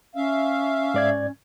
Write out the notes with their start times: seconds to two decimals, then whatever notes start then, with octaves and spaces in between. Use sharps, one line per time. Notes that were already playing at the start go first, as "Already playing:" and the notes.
0.15 C#4 E5 F5
0.94 G#2 D5 G#6